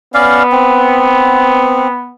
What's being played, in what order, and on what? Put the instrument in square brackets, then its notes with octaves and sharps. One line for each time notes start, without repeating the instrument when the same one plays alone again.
[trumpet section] B3 [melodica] C#4 D5 F5
[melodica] C4